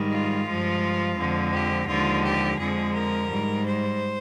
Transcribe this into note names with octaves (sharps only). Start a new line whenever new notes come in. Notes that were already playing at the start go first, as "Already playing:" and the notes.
Already playing: G#2 D#3 G3
F4
G2 F3 G#3
F2 D3 F3 G#3
G4
D#2 D3 F3 G#3 F4
G4
F2 D3 F3 G#3 G#4
A#4
G#2 G3
C5